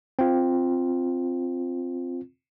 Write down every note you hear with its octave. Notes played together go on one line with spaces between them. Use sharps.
C4 F4